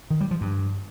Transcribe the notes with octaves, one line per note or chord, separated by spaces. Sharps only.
D#3
G3
F3
G2